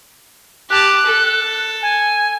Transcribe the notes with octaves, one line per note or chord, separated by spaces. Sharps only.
G4 A5 F#6
A4
G#5